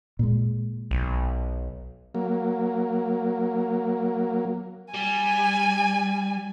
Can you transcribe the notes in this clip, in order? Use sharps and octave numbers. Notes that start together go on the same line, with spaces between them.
A#2 G#3
B1
F#3 A#3
G3 G#5